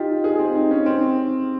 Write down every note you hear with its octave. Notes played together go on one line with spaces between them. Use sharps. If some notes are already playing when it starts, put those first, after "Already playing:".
Already playing: D#4 F4 G4
G#4
C4
D#4
C#4
C4